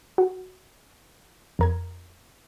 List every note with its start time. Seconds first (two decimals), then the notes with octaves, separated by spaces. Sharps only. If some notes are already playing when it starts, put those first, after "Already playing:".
0.18 F#4
1.59 F2 A#4 G#6